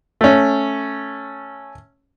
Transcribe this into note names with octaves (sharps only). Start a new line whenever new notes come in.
A3 C#4